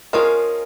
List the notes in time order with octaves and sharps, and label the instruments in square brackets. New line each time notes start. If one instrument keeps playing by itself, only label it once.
[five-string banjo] F3 G#3 C#4 F4 G#4 [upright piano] A#4